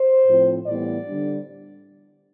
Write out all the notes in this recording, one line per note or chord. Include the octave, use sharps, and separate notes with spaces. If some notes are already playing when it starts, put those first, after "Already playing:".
Already playing: C5
A2 F3 C4
A2 E3 G3 B3 D5
D3 G3 D4